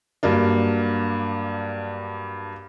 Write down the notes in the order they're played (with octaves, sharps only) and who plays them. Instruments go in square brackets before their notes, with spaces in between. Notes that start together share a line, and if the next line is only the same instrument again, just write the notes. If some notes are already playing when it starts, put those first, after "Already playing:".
[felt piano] G2 F#3 A#3 D4